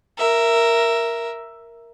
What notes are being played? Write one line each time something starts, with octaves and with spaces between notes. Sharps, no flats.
A#4 E5